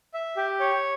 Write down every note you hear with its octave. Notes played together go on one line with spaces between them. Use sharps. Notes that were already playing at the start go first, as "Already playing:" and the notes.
E5
G4
C#5